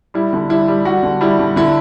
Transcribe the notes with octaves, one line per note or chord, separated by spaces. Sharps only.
G3 E4
D3
G3 E4
G3
G3 F#4
D3
G3 E4
D3
D3 E4